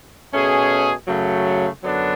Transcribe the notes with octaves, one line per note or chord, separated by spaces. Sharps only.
B2 A3 C#4 G#4
F#2 C#3 F#3 A3
F#2 D3 F#3 B3 D4